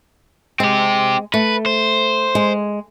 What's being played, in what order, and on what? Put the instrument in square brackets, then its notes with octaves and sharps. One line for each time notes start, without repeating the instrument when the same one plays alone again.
[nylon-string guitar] G#3 [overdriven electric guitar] C4 G4
[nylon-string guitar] A3 [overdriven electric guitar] B4
[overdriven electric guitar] C5
[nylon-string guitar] G#3